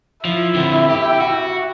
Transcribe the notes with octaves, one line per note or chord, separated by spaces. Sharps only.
F3 E4
D3 C4
G4
F#4